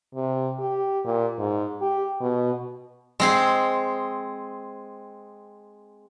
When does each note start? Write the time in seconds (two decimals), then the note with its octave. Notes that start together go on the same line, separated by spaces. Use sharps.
0.15 C3
0.59 G4
1.05 A#2
1.38 G#2
1.82 G4
2.21 B2
3.20 G#3 C4 G#4